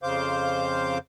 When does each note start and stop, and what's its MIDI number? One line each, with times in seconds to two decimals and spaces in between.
0.03 0.98 41
0.03 0.98 49
0.03 0.98 72
0.03 0.98 77
0.03 0.98 86
0.03 0.98 91